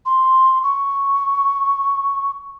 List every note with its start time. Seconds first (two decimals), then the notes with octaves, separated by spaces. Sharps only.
0.06 C6
0.64 C#6